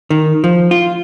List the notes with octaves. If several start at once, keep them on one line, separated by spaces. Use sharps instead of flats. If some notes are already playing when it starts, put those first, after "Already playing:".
D#3
F3
F4